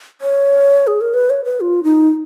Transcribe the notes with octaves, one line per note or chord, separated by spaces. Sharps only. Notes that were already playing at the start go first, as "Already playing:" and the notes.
C#5
G#4
A#4
B4
C#5
B4
F4
D#4